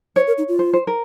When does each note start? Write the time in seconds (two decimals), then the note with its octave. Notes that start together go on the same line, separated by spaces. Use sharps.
0.16 C5 C#5
0.27 A#4
0.38 D#4
0.48 F4
0.59 C5
0.73 C5
0.87 A#4